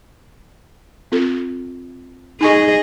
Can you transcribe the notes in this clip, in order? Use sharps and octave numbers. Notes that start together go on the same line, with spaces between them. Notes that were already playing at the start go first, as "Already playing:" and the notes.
C4 F4 A4
D#4 G#4 D#5 G#5 C#6